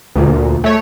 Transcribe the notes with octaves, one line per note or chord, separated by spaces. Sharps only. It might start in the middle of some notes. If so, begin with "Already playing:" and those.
D2 A#2
A3 C#5